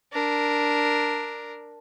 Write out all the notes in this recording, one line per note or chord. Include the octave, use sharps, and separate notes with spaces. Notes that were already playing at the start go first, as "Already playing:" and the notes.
D4 A#4